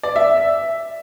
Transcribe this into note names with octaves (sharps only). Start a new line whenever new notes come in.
D5
E5